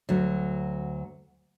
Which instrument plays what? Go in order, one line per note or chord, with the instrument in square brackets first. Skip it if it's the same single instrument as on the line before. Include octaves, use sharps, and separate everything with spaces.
[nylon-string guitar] D2 F#3